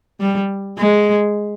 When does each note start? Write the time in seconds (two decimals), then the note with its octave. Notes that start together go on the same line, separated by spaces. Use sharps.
0.21 G3
0.78 G#3